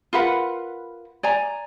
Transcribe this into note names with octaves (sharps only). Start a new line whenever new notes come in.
F4 A#4 B4 F#5
D5 G#5 A#5